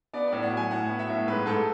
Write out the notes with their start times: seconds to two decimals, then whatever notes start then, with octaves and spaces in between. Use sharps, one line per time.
0.14 B3 D5
0.27 A2 D5
0.42 F#5
0.51 F#3
0.57 G#5
0.71 A2 F#5
0.89 B3
0.99 E5
1.09 A2
1.27 G#2 B4
1.46 G#2 A4